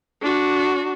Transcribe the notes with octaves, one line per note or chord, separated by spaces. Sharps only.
D4 F#4